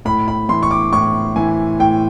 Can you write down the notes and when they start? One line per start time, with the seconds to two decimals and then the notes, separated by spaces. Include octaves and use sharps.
0.05 A2 B5
0.28 B5
0.49 E3 C6
0.63 C#6
0.71 D6
0.93 A2 C#6
1.36 E3 G#5
1.79 A2 G5